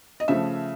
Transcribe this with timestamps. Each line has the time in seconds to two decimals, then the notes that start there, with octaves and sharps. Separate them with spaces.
0.20 D#5
0.28 C#3 F3 A3 E5